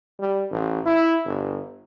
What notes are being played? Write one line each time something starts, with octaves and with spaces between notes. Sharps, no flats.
G3
A1
E4
G1